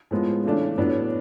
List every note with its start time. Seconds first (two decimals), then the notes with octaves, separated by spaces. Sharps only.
0.11 A2 F3 G#3 B3
0.44 C#3 E3 A3 D4
0.78 A2 F#3 B3 D4